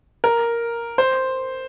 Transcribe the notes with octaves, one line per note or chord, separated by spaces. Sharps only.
A#4
C5